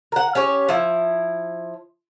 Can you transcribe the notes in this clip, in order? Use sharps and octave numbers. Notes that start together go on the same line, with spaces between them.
A#4 F#5
C#4 G4 C#5
F3 E4